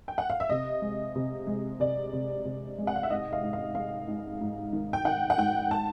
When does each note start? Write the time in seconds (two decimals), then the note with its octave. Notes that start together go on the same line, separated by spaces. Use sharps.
0.08 G5
0.18 F#5
0.30 F5
0.40 E5
0.49 C3 D#5
0.82 G#3
1.15 C3
1.47 G#3
1.80 C3 D5
2.13 C3
2.45 C3
2.78 G#3
2.87 F#5
2.96 F5
3.03 E5
3.10 G#2 D#5
3.33 F5
3.43 G#2
3.53 F5
3.75 G#3 F5
4.08 G#2
4.41 G#2
4.73 D#3
4.93 G5
5.05 D#3 F#5
5.30 F#5
5.38 G#2 G5
5.71 A5